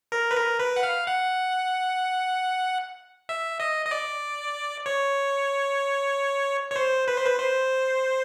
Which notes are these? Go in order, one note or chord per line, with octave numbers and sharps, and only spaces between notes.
A#4
B4
A#4
B4
F#5
F5
F#5
E5
D#5
D#5
D5
C#5
C#5
C5
B4
C5
B4
C5